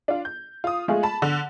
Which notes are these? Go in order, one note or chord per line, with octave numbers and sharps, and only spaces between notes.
D4 F4
G6
F4 D#6
G#3 A3 F4 G#4
A5 B5
D3